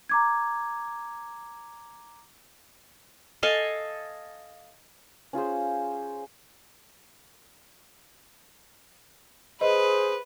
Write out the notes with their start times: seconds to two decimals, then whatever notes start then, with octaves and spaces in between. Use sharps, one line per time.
0.09 A#5 D6 G#6
3.43 A4 D#5 F5 G#5
5.33 C#4 F4 G#4 C5
9.61 G#4 B4 C5 D#5